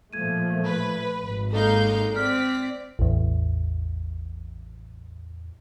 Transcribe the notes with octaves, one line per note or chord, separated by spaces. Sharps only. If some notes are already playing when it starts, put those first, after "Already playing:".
A#2 F3 A3 G#6 D#7
B4
G#1
G#3 A#3 D#4 A4 F5 G6
C4 D5 F6 B6
A1 E2